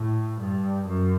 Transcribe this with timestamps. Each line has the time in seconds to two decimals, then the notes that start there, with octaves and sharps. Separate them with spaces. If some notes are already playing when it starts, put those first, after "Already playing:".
Already playing: A2
0.40 G2
0.87 F#2